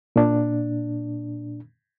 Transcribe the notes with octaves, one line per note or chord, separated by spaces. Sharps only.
A#2 D4